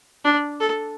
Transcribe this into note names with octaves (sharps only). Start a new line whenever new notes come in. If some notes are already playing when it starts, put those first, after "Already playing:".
D4
A4